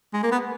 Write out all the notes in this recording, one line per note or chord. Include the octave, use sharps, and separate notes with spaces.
G#3
A#3
B3